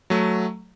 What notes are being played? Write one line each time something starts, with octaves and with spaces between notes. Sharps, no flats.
F#3 A3